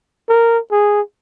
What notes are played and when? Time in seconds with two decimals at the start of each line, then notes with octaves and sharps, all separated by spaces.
0.29 A#4
0.71 G#4